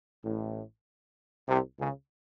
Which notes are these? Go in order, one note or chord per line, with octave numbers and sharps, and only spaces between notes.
A1 A2
C2 C3
C#2 C#3